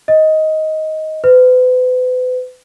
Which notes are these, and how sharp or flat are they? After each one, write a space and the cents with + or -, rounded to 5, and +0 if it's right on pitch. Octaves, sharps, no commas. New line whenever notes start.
D#5 +10
B4 +40